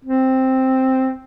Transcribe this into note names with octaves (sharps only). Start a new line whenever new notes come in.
C4